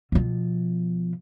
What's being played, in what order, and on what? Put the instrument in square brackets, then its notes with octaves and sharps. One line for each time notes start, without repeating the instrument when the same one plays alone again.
[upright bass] B2 F3